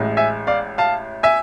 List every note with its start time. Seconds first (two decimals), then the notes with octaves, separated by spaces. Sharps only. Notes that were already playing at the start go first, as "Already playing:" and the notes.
Already playing: A1 A2 G#3
0.17 E5 G#5
0.47 D5 F5
0.78 F5 A5
1.23 E5 G#5